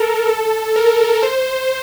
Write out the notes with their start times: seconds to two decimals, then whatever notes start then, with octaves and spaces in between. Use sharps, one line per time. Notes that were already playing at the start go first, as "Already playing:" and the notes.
Already playing: A4 A#4
0.29 A4
0.76 A#4
1.23 C5